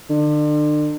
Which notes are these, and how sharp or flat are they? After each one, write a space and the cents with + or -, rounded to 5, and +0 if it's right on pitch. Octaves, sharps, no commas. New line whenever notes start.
D3 +35